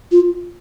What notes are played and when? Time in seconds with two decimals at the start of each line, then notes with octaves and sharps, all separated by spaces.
0.12 F4